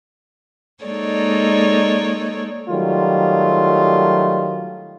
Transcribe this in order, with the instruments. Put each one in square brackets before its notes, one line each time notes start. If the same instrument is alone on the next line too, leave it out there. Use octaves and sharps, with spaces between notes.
[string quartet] G#3 A#3 D#4 A4 C#5 D5
[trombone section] D#3 F#3 G3 A3 F4